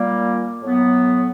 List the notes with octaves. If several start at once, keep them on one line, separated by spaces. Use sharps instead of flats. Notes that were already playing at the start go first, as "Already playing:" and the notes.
Already playing: A#2 G3 A#3
A2 F#3 B3